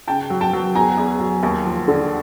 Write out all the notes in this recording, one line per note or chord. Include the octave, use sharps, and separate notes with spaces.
C#3 G5 A5
F#3
G5 A5
F#3
E2 G#5 A#5
E2
F#3
D#2
F3
D3